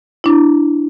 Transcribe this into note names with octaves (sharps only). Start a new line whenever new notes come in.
D4 E4